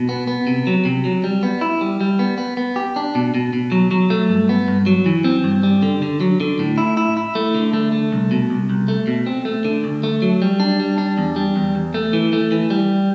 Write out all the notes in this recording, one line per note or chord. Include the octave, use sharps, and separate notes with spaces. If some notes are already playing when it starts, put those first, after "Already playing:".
Already playing: B2
B3
B3
C3
F#3
C3
F#3
G3
B3
E4
G3
G3
B3
B3
B3
G4
D4
B2
B2
B2
F#3
F#3
A3
G2
B3
G2
F#3
E3
C4
G2
G3
D3
D3
F#3
D3
A2
E4
E4
E4
A3
D3
A3
A3
C2
B2
C2
C2
A3
B2
C4
A3
D3
D2
A3
F#3
G3
D4
G3
D4
E2
G3
E2
E2
A3
E3
A3
E3
G3